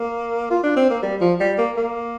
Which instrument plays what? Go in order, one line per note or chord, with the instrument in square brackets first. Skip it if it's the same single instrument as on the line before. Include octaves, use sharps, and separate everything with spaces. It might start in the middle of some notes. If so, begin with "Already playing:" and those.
Already playing: [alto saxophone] A#3
F4
D4
C4
A#3
G3
F3
G3
A#3
A#3